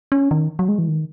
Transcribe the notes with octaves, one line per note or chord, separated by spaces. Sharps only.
C#4
D#3
F#3
G#3
E3
D#3